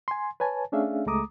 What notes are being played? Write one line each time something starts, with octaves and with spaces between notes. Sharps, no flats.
G#5 C6
B4 C#5 G#5 A5
A3 C#4 D4 G#4 E5 F5
C#2 G#3 A3 A#5 D6 D#6